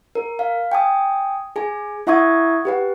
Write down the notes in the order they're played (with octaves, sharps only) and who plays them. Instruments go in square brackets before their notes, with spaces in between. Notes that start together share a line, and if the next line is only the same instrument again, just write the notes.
[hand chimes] A#4
F5
G5 G#5 D#6
G#4 G#5
E4 E5 F#5 C#6 D#6 G#6
G4 B4 F#5